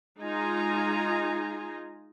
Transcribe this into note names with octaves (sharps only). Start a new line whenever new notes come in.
G#3 D#4 F4 G#5 A#5